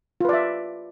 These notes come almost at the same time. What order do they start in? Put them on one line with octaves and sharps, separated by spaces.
F4 B4 D5 E5